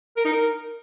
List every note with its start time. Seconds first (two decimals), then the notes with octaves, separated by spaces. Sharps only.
0.17 A#4
0.25 D#4
0.33 A#4